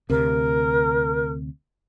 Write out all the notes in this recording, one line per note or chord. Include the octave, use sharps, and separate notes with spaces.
D2 C3 A#4